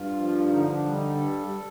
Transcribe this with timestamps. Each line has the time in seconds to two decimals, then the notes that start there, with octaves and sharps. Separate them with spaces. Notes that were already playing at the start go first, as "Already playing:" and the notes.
Already playing: G2 F4
0.18 F3
0.51 D3 D#4
0.72 D4
0.84 G3
0.94 D#4
1.15 G2 A4